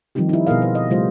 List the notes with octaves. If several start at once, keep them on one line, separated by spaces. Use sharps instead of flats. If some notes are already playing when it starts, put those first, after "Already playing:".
D#3 F3 G3 C4 D#4 G4
D#4 E4
B2 B3 G#4 A#4 D#5 F5
C5
D#5
C#3 F3 G3 A3 F4 C5